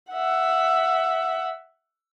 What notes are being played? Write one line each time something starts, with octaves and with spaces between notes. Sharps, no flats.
E5 F#5